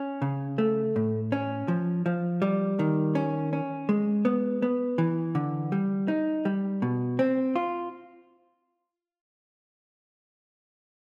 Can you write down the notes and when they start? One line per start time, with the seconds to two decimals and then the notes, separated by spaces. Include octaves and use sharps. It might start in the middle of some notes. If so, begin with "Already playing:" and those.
Already playing: C#4
0.22 C#3
0.58 A3
0.96 A2
1.32 C#4
1.68 F3
2.06 F3
2.42 G3
2.79 D#3
3.15 C#4
3.53 C#4
3.89 G#3
4.25 B3
4.62 B3
4.98 E3
5.35 D3
5.72 G3
6.08 D#4
6.45 G3
6.82 B2
7.19 C4
7.56 F4